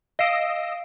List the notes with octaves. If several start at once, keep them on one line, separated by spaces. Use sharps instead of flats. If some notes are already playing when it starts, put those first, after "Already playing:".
D#5 F5 E6 A#6 C7 D7